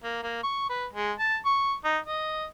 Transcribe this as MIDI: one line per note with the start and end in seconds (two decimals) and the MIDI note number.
0.04 0.20 58
0.23 0.42 58
0.43 0.66 85
0.69 0.85 71
0.93 1.12 56
1.19 1.37 81
1.45 1.74 85
1.84 1.98 63
2.06 2.45 75